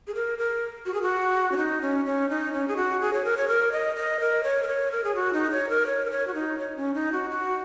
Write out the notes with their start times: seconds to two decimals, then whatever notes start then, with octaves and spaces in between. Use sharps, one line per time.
0.07 G#4
0.15 A#4
0.39 A#4
0.86 F#4
0.94 G#4
1.02 F#4
1.52 C#4
1.57 D#4
1.82 C#4
2.06 C#4
2.29 D#4
2.53 C#4
2.68 G#4
2.77 F#4
3.01 G#4
3.13 C#5
3.25 A#4
3.37 C#5
3.48 A#4
3.72 D#5
3.96 D#5
4.20 A#4
4.44 C#5
4.63 A#4
4.67 C#5
4.92 A#4
5.04 G#4
5.15 F#4
5.33 D#4
5.51 C#5
5.69 A#4
5.87 C#5
6.05 A#4
6.11 C#5
6.27 F#4
6.34 D#4
6.59 C#5
6.77 C#4
6.94 D#4
7.12 F#4
7.30 F#4